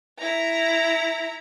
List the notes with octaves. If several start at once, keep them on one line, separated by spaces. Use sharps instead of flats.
E4 A#5